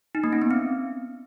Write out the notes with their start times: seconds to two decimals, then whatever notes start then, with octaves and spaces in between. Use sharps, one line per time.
0.15 D#4
0.24 A#3
0.33 C#4
0.42 B3
0.51 C4